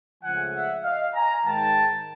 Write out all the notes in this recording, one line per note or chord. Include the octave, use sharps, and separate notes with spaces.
C#2 C#3 F3 A3 F#5 G#5
E5 F#5
D#5 F5
G#5 A#5
G#2 D#3 G#3 G5 A5